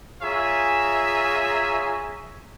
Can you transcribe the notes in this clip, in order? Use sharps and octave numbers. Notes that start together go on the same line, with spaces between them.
F4 G#4 C#5 E5 G#5 A#5